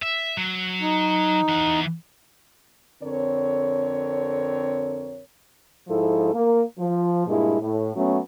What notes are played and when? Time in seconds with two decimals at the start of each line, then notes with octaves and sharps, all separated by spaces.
0.02 E5
0.37 F#3
0.81 D#4
1.49 E3 F#5
3.03 F2 D3 C4 A#4 C#5
5.88 G#2 F3 E4 A4
6.33 A#3
6.78 F3
7.26 G2 A#2 G#3 E4
7.60 A2
7.95 F#3 A3 B3 C#4